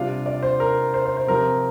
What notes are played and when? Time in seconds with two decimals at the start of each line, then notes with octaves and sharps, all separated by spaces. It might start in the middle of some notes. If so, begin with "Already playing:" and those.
Already playing: C3 G3 D4 F4 F5
0.26 D5
0.43 C5
0.60 A#4
0.94 C5
1.05 C5
1.17 C5
1.27 C3 F3 C4 A#4